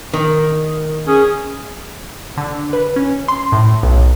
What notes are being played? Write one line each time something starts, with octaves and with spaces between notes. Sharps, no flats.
D#3
C#4 G#4
D3
B4
C#4
C6
A2
B1